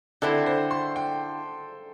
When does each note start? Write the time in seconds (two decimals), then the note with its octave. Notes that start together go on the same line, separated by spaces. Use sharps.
0.22 D3 C4 E4 A4
0.46 C5
0.71 C6
0.96 G5